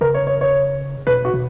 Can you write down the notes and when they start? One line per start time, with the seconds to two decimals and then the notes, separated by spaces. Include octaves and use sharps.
0.01 C#3 A#4
0.14 C#5
0.27 C#5
0.41 C#5
1.07 B2 B4
1.25 F#4
1.34 B2